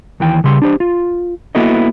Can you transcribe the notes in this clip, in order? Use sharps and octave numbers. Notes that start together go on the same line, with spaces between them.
D#2 E3 G5
C#3 G3 C6
D4 G4 C5
F4
A#3 B3 E4 F#4 A4 D#5